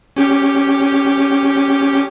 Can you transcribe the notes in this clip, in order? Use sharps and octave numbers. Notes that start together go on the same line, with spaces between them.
C#4 G4